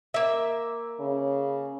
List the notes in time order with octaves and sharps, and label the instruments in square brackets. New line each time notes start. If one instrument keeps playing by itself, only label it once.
[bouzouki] A#3 E5
[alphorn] C#3